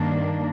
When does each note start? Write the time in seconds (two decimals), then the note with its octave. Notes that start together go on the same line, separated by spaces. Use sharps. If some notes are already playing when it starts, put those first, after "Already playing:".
Already playing: G2 D#3 A#3 D4